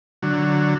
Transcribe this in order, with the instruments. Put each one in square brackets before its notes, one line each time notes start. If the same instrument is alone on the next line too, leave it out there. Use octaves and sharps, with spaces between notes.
[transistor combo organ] D3 F#3